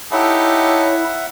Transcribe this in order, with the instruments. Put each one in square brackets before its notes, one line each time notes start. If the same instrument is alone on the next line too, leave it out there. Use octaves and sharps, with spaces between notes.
[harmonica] D#4 G4 A4 [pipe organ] E4 [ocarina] C#5 [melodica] E5 F#5